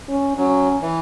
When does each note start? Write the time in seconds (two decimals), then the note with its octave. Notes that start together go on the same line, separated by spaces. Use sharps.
0.08 C#4
0.37 F#3 C#4
0.82 E3